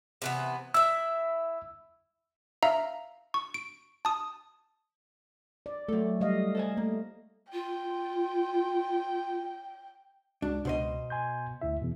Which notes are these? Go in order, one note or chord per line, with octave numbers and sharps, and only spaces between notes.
C3 E3 B3
E4 E5 E6
E5 F5 A#5
C#6
D7
A5 D#6
D5
F#3 A3 A4
G3 D#5 F5
A4 C5 G#5
A3 A#3
F4 G5
C#2 G#3 D4 F#4
C#2 B2 C5 D#5
G#5 C6 G6
D2 E4 E5
E2 B2